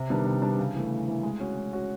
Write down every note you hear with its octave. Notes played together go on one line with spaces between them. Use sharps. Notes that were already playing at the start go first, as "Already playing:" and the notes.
Already playing: C3
D#3 G3 B3 D4
C3
D#3 G3 B3 D4
C#3
E3 A3
C#3
E3 A3
G#3
C#4 F#4
G#3
C#4 F#4